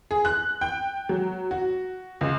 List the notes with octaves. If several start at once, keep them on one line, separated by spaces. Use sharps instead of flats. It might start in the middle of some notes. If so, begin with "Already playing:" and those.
G#4
F#6
G5
F#3
F#4
C#2